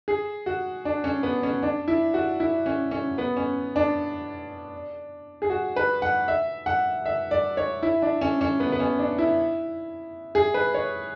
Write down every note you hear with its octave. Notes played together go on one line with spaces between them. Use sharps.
G#4
F#4
D4
C#4
B3
C#4
D4
E4
F#4
E4
C#4
C#4
B3
C#4
D4
G#4
F#4
B4
F#5
E5
F#5
E5
D5
C#5
E4
D4
C#4
C#4
B3
B3
C#4
D4
E4
G#4
B4
C#5